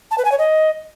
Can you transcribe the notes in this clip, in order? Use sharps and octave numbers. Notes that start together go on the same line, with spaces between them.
A5
B4
G#5
C#5
D#5